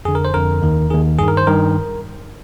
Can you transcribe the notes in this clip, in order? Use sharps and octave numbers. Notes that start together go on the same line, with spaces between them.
F2 D3 G#4
A#4
C5
F2 D3 A#4
D#2 D#3
D#2 D#3 G#4
G2 D#3 G#4
A#4
C5
G2 D#3 A#4